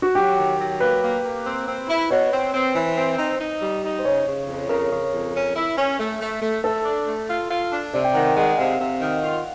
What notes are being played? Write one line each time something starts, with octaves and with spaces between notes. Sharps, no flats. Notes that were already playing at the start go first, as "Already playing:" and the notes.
F#4
F#3 G4
D#3
F#3
A#3 B4
A#3
A#3
C4
C4
E4
B2 C#5
C4
C4
E3 C5
C4
D#4
D#4
G3
D#4
C5
C#3 C#5
C#3
F2
C#3 A#4
C#3
F2
C#4
E4
C#4
A3
A3
A3
A3 A4
D4
A3
F4
F4
D4
C3 D5
G5
D#3 F#5
G#3 F#5
C3 F5
C3
D#3
F4